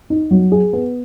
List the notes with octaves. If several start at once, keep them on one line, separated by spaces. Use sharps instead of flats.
D#4
F#3
G#4
B3